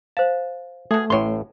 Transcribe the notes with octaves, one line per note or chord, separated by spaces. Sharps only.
C5 F5 A5
B2 A3 G#4
A1 A2 C#5 C6